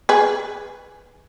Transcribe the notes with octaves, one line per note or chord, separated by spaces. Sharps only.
G#4 B4